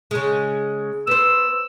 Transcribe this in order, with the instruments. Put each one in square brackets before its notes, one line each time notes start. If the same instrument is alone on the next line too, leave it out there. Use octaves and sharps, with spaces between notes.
[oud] C#3 G#3
[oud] B3 C5 [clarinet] E6